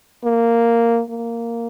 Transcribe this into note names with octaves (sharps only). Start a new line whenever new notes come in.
A#3
A#3